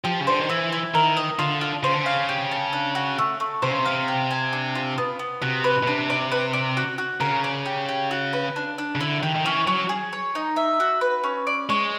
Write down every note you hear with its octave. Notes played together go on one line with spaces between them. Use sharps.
F3 G4
C#3
D3 C5
D#3
E3 E4
E4
D#3 A#4
D#5
D3 F4
F4
C#3 C5
D3
C#3 F5
G4
A5
D4
F#4
A3
A3
C3 C5
C#3
C3
F5
G4
G#5
D4
F4
B3
B3
C3 F#4
B4
B2
C3 D4
D5
B4
D5
F#4
F#4
C#3 A#4
D5
G4
G4
F#4
B4
D4
D4
C#3
D3 E4
D#3 G4
D#3
E3 C#4
F#3 C#4
G#4
C#5
D#4
E5
F#4
B4
C#4
D5
G#3 C#5